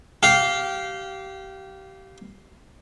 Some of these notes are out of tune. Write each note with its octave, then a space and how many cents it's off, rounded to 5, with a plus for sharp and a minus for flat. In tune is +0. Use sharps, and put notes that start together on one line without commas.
G4 -25 F5 +0